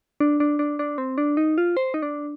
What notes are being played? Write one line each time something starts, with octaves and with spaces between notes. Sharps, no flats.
D4
D4
D4
D4
C4
D4
D#4
F4
C5
D#4
D4